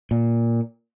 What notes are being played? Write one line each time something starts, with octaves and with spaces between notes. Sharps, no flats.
A#2